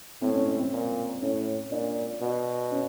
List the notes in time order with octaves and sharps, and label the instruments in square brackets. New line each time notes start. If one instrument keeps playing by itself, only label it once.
[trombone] A2 [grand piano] C4
[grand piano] C#4
C#4
C4
[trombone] A#2
[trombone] A2 [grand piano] C#4
[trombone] A#2 [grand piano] D4
[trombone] B2
[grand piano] C#4